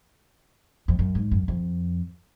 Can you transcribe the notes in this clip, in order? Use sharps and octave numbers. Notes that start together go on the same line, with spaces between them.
F2
F#2
G#2
F#2
F2